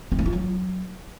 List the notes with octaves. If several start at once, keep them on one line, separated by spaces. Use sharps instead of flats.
C4
C#4
F4
F#3